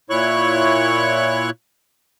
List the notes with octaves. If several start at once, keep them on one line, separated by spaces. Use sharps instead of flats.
A#2 E4 C#5 C#6 F#6